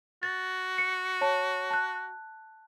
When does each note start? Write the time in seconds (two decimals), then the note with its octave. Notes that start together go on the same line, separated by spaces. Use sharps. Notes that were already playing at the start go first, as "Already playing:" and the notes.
0.23 F#4 A6
0.78 C#7
1.21 C#5 A5
1.70 A5 F#6